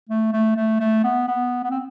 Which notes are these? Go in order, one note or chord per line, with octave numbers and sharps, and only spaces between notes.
A3
A3
A3
A3
B3
B3
B3
C4